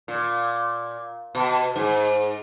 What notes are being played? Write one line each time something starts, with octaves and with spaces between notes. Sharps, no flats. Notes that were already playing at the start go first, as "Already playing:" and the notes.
A#2
B2
G#2